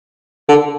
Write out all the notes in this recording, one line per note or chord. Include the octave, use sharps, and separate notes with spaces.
D3